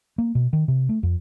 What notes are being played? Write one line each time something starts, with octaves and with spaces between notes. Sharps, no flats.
A#3
B2
D#3
C3
A3
F2